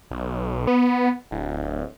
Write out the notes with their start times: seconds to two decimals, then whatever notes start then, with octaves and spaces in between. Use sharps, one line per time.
0.11 B1
0.67 B3
1.31 D1